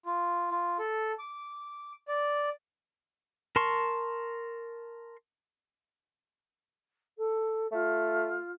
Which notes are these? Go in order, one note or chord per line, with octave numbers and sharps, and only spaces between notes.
F4
F4
A4
D6
D5
A#4 A5 C6 C#6
A4
A3 F4